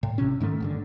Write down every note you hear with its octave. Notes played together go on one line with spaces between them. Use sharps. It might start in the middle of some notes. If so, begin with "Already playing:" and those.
A2
A1 C3 C#4
G#2 D#3 A3
G1 B2 D3